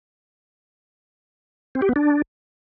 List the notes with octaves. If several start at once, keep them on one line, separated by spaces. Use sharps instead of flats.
C4
G4
B3
D4